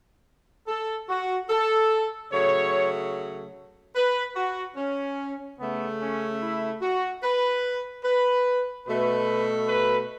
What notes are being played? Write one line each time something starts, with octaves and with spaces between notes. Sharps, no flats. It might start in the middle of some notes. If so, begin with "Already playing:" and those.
A4
F#4
A4
C#3 F#3 A3 C#5
B4
F#4
C#4
C#3 A3 B3
C#4
E4
F#4
B4
B4
B2 A3 B4
B4